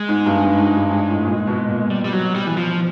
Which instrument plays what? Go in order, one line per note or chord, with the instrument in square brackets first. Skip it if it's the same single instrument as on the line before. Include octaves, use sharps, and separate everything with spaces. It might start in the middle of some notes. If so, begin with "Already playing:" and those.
Already playing: [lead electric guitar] G#3
[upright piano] G#2
G2
G2
G#2
G2
G#2
A2
A#2
B2
A#2
[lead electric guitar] G3
G3
F#3
G3
E3
F3